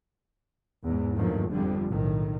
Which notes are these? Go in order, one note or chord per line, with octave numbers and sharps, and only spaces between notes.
E2 G#2
G2 A#2 D#3 F3 F#3 A3
G1 F2 G#2 D3 F3 G3
B1 A2 D#3